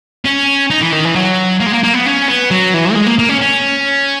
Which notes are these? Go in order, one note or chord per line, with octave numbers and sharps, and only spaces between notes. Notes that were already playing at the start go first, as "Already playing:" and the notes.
C#4
D#4
E3
D#3
E3
F#3
A#3
G#3
A#3
A#3
B3
C#4
B3
F#3
E3
A#3
G#3
A#3
A#3
C#4
C#4